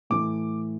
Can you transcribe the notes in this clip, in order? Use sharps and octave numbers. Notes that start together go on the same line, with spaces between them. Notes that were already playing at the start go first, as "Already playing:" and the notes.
A2 E3 A3 D6